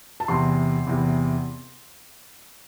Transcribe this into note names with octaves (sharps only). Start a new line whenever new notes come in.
A5
E2 C3 E3 C6
E2 C3 E3